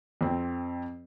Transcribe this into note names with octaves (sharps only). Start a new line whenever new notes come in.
F2 C4